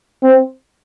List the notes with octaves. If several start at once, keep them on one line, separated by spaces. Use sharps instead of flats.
C4